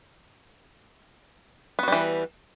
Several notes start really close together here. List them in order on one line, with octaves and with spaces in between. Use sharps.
B3 F#4 G3 E3